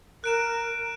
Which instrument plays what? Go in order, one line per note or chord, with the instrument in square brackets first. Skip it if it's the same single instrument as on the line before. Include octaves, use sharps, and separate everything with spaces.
[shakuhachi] A#4 [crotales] F#6 D7 E7